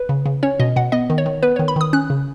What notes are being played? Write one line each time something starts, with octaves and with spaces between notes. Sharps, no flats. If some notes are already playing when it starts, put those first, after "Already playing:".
Already playing: B4
C#3
C#3
C#4 C#5
B2 D#5
B2 F#5
B3 D#5
D#3
C#5
D#3
B3 B4
D#3 C#5
B5
D#3 D#6
C#4 F#6
C#3